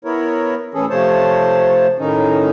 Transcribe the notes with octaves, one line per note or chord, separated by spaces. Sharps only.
B3 E4 A#4 C#5
A2 E3 C#4 G#4 A4
C3 F3 A3 C5 C#5 A5
A2 D#3 C#4 D#4